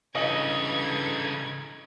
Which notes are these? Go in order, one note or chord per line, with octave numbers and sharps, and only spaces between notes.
G2 C#3 E3 D#4 A4 D#5 G#6 F#7